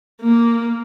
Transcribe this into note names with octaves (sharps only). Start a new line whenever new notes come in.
A#3